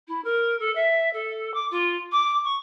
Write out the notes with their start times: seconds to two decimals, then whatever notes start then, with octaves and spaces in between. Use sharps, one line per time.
0.08 E4
0.24 A#4
0.59 A4
0.75 E5
1.13 A4
1.54 D6
1.71 F4
2.12 D6
2.44 C#6